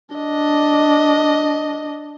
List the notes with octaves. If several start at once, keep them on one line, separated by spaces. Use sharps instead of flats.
D4 D#5